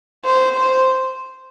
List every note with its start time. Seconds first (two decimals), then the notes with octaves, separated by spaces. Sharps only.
0.25 C5
0.58 C5